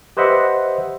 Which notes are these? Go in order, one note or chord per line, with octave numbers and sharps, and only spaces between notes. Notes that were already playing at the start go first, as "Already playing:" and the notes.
G4 B4 C5 D#5 E5 F#5